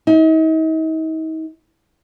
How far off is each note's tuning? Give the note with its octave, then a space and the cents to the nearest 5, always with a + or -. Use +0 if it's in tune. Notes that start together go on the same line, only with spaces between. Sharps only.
D#4 +40